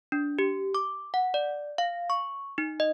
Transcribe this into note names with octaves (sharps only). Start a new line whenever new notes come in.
D4
G4
D6
F#5
D5
F5
C#6
D#4
D#5